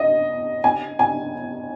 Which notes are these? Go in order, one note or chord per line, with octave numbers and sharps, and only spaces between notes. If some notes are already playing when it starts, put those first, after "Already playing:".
Already playing: D#5
G#5
G#5